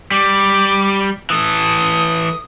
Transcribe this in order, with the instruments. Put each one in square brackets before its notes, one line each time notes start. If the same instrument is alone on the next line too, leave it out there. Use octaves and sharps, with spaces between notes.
[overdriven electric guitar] G3 [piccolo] D6
[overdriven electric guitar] E3 A4 [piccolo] D#6